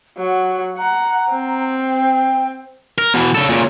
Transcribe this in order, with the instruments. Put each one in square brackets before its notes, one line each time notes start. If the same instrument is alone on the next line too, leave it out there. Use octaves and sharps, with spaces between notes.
[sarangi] F#3 [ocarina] F#5
[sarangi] F#5 [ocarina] A#5
[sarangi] C4
[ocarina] G5
[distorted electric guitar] A#4
B2 E3
C#3 A4
A#2 C#3